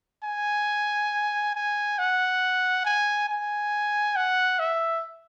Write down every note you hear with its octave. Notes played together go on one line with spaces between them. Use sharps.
G#5
G#5
F#5
G#5
G#5
F#5
E5